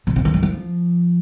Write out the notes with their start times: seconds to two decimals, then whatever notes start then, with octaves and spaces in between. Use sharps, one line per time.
0.07 B2
0.16 C3
0.25 D3
0.34 D#3
0.43 F3